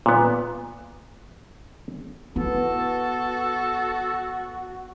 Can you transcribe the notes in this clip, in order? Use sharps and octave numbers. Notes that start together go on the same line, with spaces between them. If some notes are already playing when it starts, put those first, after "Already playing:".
A#2 B3
B3 E4 F#4 A4